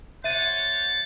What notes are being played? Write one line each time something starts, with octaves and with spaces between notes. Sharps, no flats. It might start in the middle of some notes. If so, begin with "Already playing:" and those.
C5 C#5 E5 F#5 A6 D#7